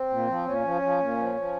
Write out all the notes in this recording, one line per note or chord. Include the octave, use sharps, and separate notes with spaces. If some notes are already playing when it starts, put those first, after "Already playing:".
Already playing: C4
A#2
F3
A#2 C#4
F3
F3
A#2
F3
F3